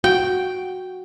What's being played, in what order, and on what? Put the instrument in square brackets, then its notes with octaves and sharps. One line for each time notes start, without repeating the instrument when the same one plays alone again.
[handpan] F#4 [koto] G5